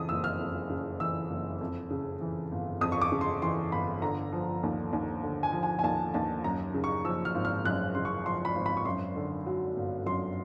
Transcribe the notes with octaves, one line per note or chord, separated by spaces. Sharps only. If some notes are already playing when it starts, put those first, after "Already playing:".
Already playing: F2 C#3 E3 D#6
F#1 E6
F6
F2
C#3
E3 E6
F#1
F2
C#3
E3
G1
F2 D#6
C#6
D6
C#3
C6
E3 C6
G1 B5
D3 A#5
F3
D#2
D#2
D3
G#5
F3
G#5
G#5
D#2 A5
D#2 A5
F#2 A#5
C#3
C#6
F3 E6
F6
G#1
F6
F#2 F#6
C#3 C6
C#6
F3 C6
B5
G#1
B5
C#6
F#2 C6
D3
F#3
G1
F#2 C6